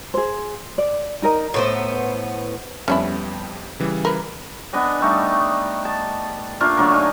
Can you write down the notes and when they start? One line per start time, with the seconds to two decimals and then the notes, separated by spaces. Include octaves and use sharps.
0.14 G#4 C5
0.78 D5
1.22 D#4 A#4 D#5 A#5
1.54 A2 B3 C5
2.88 F2 G3 B3 C#4 D4 E4
3.80 C#3 E3 G3
4.05 A#4 B4
4.73 B3 D4 D#5 G#5
5.01 G3 A3 D#4
5.85 A5
6.60 A3 A#3 D4 F4
6.77 D3 F#3 A3 A#3
6.91 D#4 F5 G#5